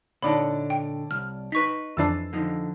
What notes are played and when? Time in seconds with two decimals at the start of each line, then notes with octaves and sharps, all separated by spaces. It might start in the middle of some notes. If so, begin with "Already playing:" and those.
0.22 A#2 D3 D#4 C#5 D5 A5 B5
0.70 G5
1.11 C2 F6
1.52 D#4 B4 C#6 B6
1.97 F2 E3 D4 E6 A6 C7
2.33 D3 F3 D#4